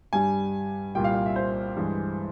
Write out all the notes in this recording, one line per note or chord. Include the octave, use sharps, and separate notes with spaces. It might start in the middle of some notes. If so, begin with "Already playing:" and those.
G2 G3 G#5
C2 A#2 G3 G5
F5
F5
E5
C5
G2 E3 G#3